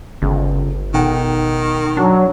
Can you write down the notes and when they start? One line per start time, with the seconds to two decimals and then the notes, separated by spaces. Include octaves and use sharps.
0.22 G1 C#2
0.94 B1 D#3 F#5 G5
1.97 F#3 D4